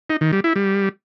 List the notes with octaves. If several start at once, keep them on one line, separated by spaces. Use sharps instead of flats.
D#4
D#3
G3
E4
G3